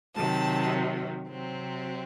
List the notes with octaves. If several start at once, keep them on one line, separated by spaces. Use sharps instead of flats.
C3 D#3 F#3 A5
C3 F#3 C4